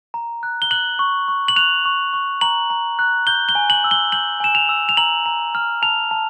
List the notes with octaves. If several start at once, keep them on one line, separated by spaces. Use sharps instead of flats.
A#5
F#6
G7
F#6 F#7
C#6
C#6
F#7
F#6 F7
C#6
C#6
A#5 F#7
A#5
F#6
G6 G7
G7
G#5
F#7
E6
G7
G6 F#7
G#5 E7
F7
E6
F7
A#5 F#7
A#5
F6
A5 F7
A5